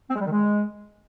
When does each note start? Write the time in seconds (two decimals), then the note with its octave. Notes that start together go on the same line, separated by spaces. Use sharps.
0.09 C4
0.15 G#3
0.20 G3
0.25 D#3
0.31 G#3